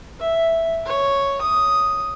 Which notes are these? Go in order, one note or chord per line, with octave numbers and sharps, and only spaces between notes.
E5
C#5
D#6